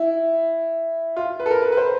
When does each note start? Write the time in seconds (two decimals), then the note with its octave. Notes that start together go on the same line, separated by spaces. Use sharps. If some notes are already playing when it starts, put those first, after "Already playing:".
Already playing: E4
1.17 F4
1.40 B4
1.46 A4
1.51 A#4
1.62 B4
1.72 B4
1.77 C5